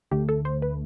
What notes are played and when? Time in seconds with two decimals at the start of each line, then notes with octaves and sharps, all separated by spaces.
0.11 D2 D3 A3 G4
0.29 A4
0.45 C5
0.62 B4